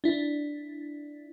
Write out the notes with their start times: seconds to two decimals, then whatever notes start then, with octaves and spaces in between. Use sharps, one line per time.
0.04 D4 E4